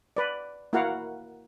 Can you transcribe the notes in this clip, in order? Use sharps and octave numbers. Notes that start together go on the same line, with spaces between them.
B4 D5
A#3 E4 F#4 A#4 F5 F#5